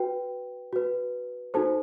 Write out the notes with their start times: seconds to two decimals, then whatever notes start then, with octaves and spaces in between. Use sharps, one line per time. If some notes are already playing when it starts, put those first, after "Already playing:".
Already playing: F#4 B4 G5
0.73 F#4 B4
1.54 D#4 F#4 A4 C5 A5